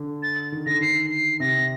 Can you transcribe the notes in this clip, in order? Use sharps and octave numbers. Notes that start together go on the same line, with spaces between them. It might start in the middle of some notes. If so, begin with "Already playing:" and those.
Already playing: D3
A6
D#3
D3 A#6
D#3 C7
C7
C3 A#6